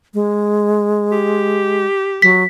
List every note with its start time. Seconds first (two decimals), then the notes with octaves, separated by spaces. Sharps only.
0.14 G#3
1.12 G4
2.22 F#3 B6